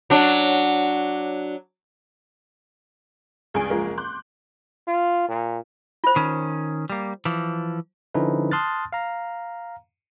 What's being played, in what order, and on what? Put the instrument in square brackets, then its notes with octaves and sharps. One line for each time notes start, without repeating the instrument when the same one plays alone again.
[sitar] F#3 D4
[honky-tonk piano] C#2 G2 G#4 G#5 D7
F#1 F3 G#3 F4 G#4 A#4
C6 D6 F#6 G6
[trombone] F4
A#2
[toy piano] F4 C5
[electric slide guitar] D#3 C#4
G3 A#3
E3 F3
[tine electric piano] D3 F3 C#4 D#4 E4 B4
A5 C6 D#6 F6 F#6 A6
F5 A#5